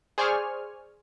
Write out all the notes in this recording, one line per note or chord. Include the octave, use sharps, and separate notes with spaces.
G#4 C5 D5 G#5 C#6 F6